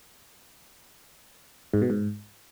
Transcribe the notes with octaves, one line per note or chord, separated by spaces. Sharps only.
G#2
B2
G#2